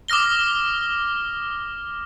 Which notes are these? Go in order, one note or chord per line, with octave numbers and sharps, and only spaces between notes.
D6 D#6 F6 A#6 G7